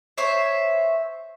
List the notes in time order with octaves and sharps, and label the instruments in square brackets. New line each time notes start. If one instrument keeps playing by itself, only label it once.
[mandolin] C5 C#5 E5